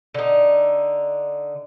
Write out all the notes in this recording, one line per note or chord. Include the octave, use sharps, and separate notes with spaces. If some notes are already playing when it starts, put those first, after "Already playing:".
D3 D#4